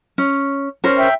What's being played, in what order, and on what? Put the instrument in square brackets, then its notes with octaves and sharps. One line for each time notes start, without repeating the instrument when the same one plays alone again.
[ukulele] C#4
C#4 A#4 C5
[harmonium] E5 G5